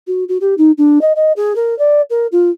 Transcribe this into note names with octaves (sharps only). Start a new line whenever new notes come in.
F#4
F#4
G4
D#4
D4
D#5
D#5
G#4
A#4
D5
A#4
F4